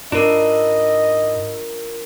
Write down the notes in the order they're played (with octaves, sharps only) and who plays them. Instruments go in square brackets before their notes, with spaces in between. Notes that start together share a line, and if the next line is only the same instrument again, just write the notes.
[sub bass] G#2 [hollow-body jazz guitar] D4 [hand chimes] F4 A#4 [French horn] D#5